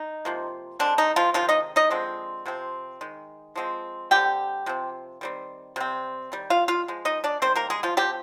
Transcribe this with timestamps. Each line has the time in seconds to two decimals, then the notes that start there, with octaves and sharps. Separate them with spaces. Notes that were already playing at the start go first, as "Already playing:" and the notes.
Already playing: D#4
0.25 C3 F3 A#3
0.79 D3 G#3 C4 D4
0.98 D#4
1.16 F3 F4
1.34 C3 D#3 F3 G#3 F4
1.49 D#4 D#5
1.76 D#4 D#5
1.90 D3 F3 G#3 C4
2.46 C3 F3 C4
3.01 D#3 G#3
3.56 F3 G#3 C4
4.11 D3 G3 C4 G4 G5
4.66 C3 F3 C4
5.21 D#3 G3 C4
5.76 C3 G3 C4
6.32 D#3 G3
6.50 F4 F5
6.68 F4 F5
6.88 F3 G#3
7.05 D#4 D#5
7.24 D4 D5
7.42 D#3 G3 C4 C5
7.56 A#3 A#4
7.70 G#3 G#4
7.83 F3 F4
7.97 F3 G3 C4 G4